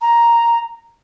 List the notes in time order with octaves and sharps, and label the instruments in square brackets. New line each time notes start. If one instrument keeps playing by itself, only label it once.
[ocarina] A#5